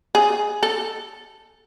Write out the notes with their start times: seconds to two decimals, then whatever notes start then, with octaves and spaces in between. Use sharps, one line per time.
0.15 G#4
0.63 A4